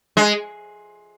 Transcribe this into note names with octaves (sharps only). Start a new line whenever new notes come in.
G#3